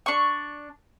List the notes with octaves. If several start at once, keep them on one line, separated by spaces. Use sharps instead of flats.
D4 C#6